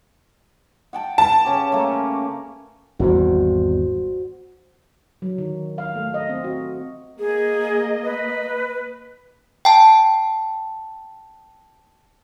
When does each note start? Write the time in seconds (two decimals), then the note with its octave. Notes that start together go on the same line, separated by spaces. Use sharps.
0.93 F#5 G5 A5
1.18 B4 A5
1.45 C#3 C#4 G4
1.72 A3 A#3
3.00 G#1 E2 G3 F#4 C5
5.22 F#3
5.38 D#3
5.78 F5
5.95 A3
6.14 D#5
6.30 C4
6.44 F#4
7.19 A#3 G#4 D#5
8.04 B4
9.65 G5 A5